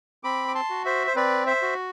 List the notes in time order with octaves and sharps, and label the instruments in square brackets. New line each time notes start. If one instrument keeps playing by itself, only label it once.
[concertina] C4 B5 D6
D6
A5 C6
F#4
C5 E5
C5
C4 B4 D5
C5 E5
F#4